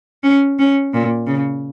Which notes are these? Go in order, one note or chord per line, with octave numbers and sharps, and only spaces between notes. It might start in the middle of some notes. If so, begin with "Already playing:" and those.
C#4
C#4
A#2
C#3